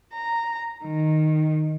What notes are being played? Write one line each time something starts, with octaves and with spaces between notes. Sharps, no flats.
A#5
D#3